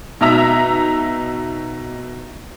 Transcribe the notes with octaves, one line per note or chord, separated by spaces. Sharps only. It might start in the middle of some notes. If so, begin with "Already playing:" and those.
B2 D#4 E5 A#5 E6 B6